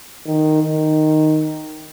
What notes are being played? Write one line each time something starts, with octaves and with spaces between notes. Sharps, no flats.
D#3
D#3